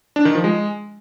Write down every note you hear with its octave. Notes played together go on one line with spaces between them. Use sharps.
D4
D#3
F3
G#3